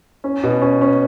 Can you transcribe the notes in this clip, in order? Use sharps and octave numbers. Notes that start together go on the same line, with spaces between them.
C#4
B2
C#4
C#4